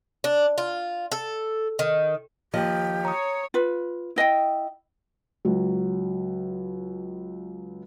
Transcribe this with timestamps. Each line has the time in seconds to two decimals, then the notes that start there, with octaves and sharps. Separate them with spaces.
0.24 D4
0.58 F4
1.12 A4
1.79 D#3
2.53 D#2 F3 G4 D#5
3.05 C#5 A#5 D#6
3.54 F4 B4
4.16 E4 D#5 F#5 G5
5.45 C#2 F#3